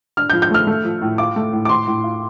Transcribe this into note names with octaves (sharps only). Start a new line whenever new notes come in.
D4 F6
F3 G6
G6
A3 F6
A3
F3
A2
F4 D6
A3
A2
D6
A2 C6
A2
F4